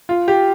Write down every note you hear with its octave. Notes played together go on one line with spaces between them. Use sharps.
F4
G4